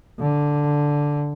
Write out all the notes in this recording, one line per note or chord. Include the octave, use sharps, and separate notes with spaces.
D3